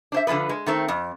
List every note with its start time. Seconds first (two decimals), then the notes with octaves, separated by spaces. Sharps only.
0.12 D4 C5 E5
0.27 D3 F3 G#3 B3 B4
0.49 G#3
0.66 D#3 A3 C4
0.88 F2